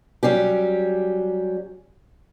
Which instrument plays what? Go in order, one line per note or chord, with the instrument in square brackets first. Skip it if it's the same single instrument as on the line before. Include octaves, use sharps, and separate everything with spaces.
[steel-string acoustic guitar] F#3 G3 C#4 G4